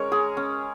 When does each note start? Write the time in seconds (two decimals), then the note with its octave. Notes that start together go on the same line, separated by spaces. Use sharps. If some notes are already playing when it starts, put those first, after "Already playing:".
Already playing: G#3 C#4 A#4 C#5
0.12 G#4
0.37 C#4